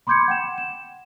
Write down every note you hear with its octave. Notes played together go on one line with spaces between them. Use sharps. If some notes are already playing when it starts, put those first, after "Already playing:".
B5 C6 D6 G6 G#6 C#7
F#5 G5 E7
E7